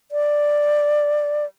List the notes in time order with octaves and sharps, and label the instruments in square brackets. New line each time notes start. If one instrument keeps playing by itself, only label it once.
[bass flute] D5